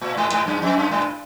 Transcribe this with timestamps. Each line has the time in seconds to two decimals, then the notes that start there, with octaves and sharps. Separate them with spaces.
0.01 A2
0.17 G#2
0.32 G#2
0.47 F#2
0.62 F2
0.77 F#2
0.91 G#2